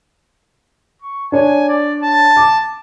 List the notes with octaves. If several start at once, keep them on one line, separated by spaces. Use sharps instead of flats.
C#6
D4 C#5 G#5
D5
A5
D6